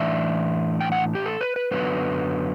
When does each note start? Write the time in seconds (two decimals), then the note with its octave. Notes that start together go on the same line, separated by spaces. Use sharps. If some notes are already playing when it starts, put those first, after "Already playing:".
Already playing: A2 E3 D4 E5
0.80 G5
0.92 F#5
1.15 G4
1.26 A4
1.41 B4
1.56 B4
1.71 F#2 D3 F#3 B3 B4